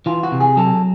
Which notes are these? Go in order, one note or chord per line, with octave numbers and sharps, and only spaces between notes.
E3 F4
F#4
C3
G#4
F#3 A4